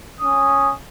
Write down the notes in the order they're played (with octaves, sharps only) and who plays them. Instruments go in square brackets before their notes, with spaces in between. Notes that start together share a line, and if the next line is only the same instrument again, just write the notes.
[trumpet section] C#4 D#6